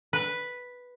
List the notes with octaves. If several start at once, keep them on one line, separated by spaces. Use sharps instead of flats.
B4